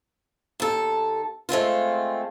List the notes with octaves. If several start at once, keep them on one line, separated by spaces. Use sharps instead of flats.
D#2 A4
G#3 A3 C4 F4